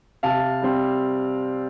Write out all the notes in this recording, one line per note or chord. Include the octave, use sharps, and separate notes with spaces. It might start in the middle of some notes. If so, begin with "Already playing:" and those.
C3 F5 A5
G3 C4